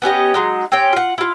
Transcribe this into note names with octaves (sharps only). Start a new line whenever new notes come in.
B3 C#4 G4 D#5
F#3 G#3 D#4
C4 C#4 G4 G5
F4 F#5
E4 F4